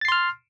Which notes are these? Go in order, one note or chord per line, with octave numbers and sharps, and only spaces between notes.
C6 F6 A6 C7